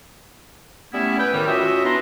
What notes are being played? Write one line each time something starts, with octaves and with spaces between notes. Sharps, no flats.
G3 A3 B3 C#4 E4
B4 G5
A2 D#3 G3
C#4 F4 F#4 C#5 D#5 E5
E3 B3 D4 D#4 A#5 C6